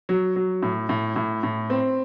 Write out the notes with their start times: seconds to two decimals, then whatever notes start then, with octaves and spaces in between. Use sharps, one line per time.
0.09 F#3
0.36 F#3
0.63 A2
0.89 A2
1.16 A2
1.43 A2
1.70 C4